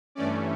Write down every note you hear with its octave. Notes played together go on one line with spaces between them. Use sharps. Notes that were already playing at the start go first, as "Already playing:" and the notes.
G2 E3 A3 C#4 D5